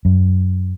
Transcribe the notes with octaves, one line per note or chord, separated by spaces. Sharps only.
F#2